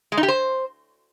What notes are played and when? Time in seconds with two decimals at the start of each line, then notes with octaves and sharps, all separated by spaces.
0.12 G#3
0.17 D#4
0.23 G4
0.28 C5